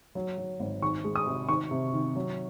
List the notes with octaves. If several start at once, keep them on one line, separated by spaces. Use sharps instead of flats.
F#3
F#3
G#1
D#3 C#6
G#3
D#6
C3
D#3 C#6
C3
D#3
F#3